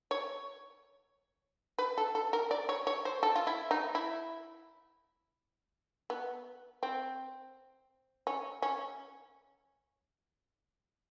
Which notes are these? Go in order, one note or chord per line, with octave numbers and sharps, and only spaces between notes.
C#5
B4
A4
A4
A#4
D5
C#5
C#5
C5
A4
F4
E4
D#4
E4
B3
C4
C#4
C#4